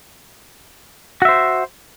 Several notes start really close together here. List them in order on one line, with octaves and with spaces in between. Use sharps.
F#4 E5 C5